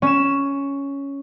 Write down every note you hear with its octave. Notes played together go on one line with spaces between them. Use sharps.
C#4 E7